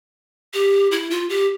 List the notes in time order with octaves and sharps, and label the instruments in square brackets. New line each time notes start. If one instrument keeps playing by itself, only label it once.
[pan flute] G4
E4
F4
G4